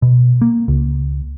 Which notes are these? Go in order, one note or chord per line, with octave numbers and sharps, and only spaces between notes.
B2
A#3
C#2